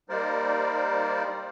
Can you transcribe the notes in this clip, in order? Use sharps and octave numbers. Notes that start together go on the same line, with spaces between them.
G3 A#3 D#4 A#4 C5 D5